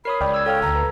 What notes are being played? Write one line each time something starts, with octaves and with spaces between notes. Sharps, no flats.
A#4 C#5 B5 D#6 C7
C#2 D5 G5 F6
E6 G#6
A4 C#5 F5 G5 F6 G#6
D2 A#5
B4